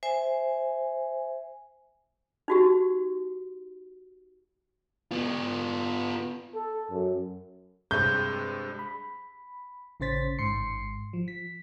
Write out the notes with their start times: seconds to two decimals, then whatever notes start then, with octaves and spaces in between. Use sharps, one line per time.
0.03 C5 E5 G#5
2.48 D#4 F#4 G4
5.11 B3 F4
6.55 A4
6.91 F#2
7.91 G2 C3 G#3 G6
8.79 B5
10.00 A1 C#3 C#4 C5 A6 B6
10.38 G#1 G#2 C6 C7 C#7
11.13 F3
11.28 B6